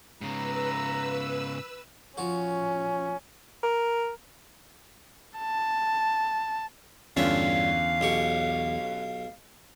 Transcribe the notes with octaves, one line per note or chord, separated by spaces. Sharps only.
G#2 C#3 B4 A#5 E6
F3 C#4 F#4
A#4
A5
E2 G2 D3 C#4 F4 E5 F5
B1 G4 C#6